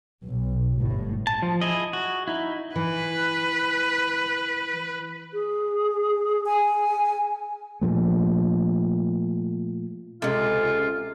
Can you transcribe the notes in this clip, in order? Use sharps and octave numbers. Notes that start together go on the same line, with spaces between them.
B1
G1 A2
A5
F3
E4 G#4 D#5
F#4
D#4 E4
E3 B4
G#4
G#5
A#2 F3 A3
C#2 C3 G#3 F4 A4